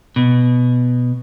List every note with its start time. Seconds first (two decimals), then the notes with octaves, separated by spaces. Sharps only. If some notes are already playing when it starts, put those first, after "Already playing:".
0.16 B2